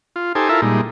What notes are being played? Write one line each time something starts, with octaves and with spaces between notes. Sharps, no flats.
F4
D#4 G4 A4 C5 G#5
E4 F4 A4 A#4 E5
A#2 G3 G#3 D#4